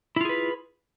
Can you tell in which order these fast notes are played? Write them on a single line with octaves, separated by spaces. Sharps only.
E4 F4 G#4 B4